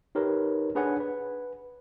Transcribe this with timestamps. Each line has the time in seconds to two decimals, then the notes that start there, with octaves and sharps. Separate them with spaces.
0.15 D#4 G4 A#4 B4 C#5
0.75 D4 G#4 B4 C#5 F#5 G#5
1.00 B4